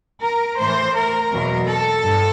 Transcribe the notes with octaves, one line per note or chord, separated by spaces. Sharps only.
A#4
A2 E3 A3 C5
A#4
E2 B2 F#3 A#3
A4
G2